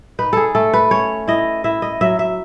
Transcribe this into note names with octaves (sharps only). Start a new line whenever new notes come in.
D#4 B4
G#4 A4
A3 A4
B4
C#4 C#5
E4 D#5
E4 E5
D#5
F#3 E5
E5